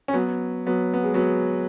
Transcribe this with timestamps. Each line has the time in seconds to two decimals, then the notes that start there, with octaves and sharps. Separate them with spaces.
0.08 C#4
0.13 F#3 B3
0.67 F#3 B3
0.94 B3
1.04 G#3
1.14 F#3 B3